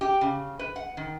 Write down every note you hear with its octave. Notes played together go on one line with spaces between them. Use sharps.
G4
C#3
B4
F#5
D#3